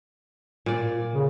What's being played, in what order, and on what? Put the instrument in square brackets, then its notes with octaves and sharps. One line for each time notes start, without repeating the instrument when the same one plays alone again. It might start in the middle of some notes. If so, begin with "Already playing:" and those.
[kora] A#2 D5
[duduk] C#3